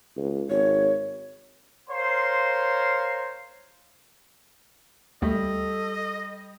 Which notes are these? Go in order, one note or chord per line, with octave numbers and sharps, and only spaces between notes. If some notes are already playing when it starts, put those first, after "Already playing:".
C#2
G#1 C#5
A#4 C5 C#5 F5 C6
D2 G3 A3 A4 D#5